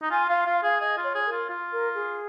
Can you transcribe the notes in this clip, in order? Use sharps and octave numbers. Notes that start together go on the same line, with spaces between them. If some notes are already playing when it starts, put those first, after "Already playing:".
D#4
F4 G#5
F4 F5
F4 F5
G#4 F5
G#4 D#5
F4
C#5
G#4
A#4
F4
F4
A#4
G#4